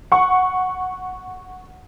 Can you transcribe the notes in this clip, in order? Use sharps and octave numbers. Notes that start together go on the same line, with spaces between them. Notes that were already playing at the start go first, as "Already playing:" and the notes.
F#5 C#6